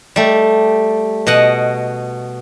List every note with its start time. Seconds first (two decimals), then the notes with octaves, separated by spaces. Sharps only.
0.16 G3 A3
1.27 B2 D#5 F#5